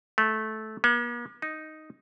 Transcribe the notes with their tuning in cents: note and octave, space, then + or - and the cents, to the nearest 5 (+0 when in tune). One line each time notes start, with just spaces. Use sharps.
A3 -15
A#3 +45
D#4 +0